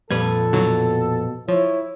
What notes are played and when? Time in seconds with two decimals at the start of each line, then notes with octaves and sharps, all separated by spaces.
0.11 F2 A#2 G3 A4 B4 G#6
0.53 B2 D3 E3 F#3
1.48 F3 E4 C#5